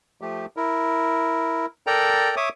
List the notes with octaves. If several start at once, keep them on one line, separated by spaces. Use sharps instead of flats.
F3 A3 G4
E4 A#4
A4 A#4 D5 G5 A#5
C#5 E5 D6 D#6